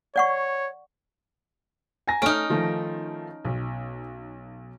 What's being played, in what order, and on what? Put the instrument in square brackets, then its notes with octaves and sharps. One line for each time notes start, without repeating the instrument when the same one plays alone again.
[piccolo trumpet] C#5 [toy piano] D5 F#5 C#6
[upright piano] G#5 A#5 A#6
[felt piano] A3 [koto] C#4 D#4 [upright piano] F6 D7
[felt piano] D#3 F3 A3
B1